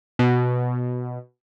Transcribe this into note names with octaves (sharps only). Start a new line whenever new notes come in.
B2